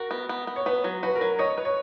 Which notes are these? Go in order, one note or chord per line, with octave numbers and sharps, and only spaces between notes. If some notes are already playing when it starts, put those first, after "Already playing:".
Already playing: F#4 A#4
B3
B3
B3
C#5
B3 B4
F#3
F#4 B4
A#4
F#3
C#5 D#5
B4
C#5